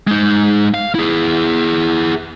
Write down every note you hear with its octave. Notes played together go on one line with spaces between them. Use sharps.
G#3 D#4
F5
E4 G#4